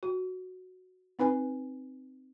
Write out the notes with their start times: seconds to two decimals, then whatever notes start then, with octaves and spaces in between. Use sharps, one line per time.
0.03 F#4
1.19 C4 D#4 B4 G#5